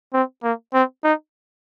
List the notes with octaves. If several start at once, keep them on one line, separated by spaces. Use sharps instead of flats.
C4
A#3
C4
D#4